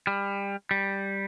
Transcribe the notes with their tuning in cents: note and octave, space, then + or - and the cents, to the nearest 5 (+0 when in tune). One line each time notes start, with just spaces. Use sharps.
G3 +25
G3 +5